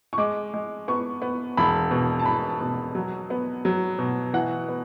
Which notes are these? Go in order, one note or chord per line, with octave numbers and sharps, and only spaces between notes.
C#6
G#3 D6
G#3
B3 C#6
B3
E1 B5
B2
A5
E1 B5
A5
B2
F#3
B3
F#3
B2
E3 F#5
B3